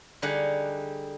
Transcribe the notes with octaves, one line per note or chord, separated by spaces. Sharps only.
D3 G3 D#4 G#4 F#5